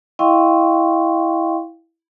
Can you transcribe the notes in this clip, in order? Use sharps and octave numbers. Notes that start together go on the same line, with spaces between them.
E4 D#5 F5 G5 C6 C#6